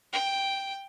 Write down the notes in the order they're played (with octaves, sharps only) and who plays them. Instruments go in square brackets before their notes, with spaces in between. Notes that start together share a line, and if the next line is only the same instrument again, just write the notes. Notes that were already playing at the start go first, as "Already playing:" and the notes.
[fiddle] G5